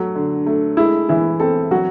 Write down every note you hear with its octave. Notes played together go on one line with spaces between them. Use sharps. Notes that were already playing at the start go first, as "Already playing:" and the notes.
Already playing: F#3 A3
D3
A3
G#3 E4
E3 E4
C4 A4
F#3 F#4